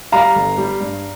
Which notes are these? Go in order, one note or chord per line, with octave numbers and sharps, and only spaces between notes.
G3 F5 A#5
G1
G3
G2